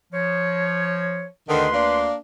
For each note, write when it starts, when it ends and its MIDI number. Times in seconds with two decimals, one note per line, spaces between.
0.13 1.26 53
0.13 1.26 73
1.49 2.06 38
1.49 1.67 50
1.49 1.67 51
1.49 2.06 71
1.49 2.06 84
1.73 2.15 58
1.73 2.15 62